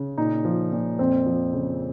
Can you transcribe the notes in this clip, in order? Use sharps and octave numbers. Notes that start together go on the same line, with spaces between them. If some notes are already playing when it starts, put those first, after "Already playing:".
Already playing: C#3
A#2 D#4
F3
A#2
F2 C4
F3
C#3